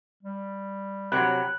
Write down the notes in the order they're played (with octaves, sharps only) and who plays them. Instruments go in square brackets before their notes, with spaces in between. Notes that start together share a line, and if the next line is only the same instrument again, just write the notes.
[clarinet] G3
[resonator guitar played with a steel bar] C3 F#3 [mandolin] C#5 G5 B5 [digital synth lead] F#6